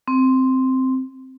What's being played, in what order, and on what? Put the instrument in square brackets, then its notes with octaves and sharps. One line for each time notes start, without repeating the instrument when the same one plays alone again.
[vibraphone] C4